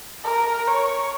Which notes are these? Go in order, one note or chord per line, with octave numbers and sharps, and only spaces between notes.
A#4
C#5